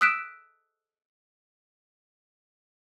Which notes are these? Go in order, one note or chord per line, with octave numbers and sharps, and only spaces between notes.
D#6 E6 F#6 B6 D7 E7